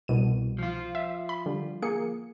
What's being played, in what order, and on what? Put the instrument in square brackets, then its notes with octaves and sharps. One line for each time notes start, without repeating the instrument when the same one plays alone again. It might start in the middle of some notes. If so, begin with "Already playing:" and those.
[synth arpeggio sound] C2 B2 D#7
[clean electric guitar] F3 F4
[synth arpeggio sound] E5
B5
D3 G3
A#3 G#4 C#7